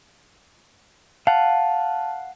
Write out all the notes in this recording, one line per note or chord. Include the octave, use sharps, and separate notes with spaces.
F5 F#5 A5